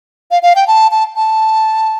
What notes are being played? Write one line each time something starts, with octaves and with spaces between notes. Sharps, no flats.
F5
F5
G5
A5
A5
A5